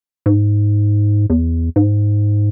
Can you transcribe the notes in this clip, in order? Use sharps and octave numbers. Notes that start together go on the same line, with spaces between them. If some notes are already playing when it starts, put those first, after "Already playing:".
G#2
E2
G#2